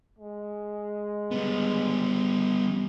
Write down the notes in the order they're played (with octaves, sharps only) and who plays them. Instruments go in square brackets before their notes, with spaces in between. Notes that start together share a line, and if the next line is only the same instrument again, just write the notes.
[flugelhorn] G#3
[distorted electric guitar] G3 B3